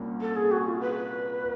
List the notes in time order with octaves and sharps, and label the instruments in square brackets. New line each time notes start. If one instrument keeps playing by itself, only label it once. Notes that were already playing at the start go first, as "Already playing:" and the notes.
Already playing: [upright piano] C2 A#2 G3 A#3 C#4
[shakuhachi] A4
G#4
F#4
F4
B4